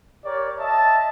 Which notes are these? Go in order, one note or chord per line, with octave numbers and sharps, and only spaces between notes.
G4 A#4 C#5 D5
D#5 E5 A5